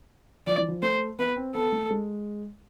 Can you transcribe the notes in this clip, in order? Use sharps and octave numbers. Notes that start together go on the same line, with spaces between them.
F3 D5
E3
F3
A3 C5
B3 B4
C4
B3 A4
A3
G#3